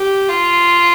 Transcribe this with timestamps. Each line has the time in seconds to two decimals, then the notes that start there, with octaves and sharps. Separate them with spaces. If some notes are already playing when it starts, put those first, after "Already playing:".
Already playing: G4
0.28 F4